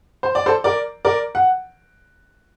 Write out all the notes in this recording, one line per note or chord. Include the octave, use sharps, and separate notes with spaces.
C5
D5
A4 C5
A#4 D5
A#4 D5
F#5